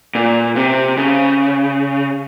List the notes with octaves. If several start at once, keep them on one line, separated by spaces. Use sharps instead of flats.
A#2
C3
C#3